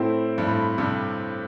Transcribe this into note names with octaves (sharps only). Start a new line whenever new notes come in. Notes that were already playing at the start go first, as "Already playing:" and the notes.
Already playing: A2 A3 C4 E4
G2
A2
G2 C3